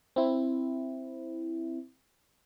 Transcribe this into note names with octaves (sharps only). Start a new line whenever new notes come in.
C4 E4